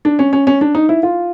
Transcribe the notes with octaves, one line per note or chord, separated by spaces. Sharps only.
D4
C#4
C#4
C#4
D4
D#4
E4
F4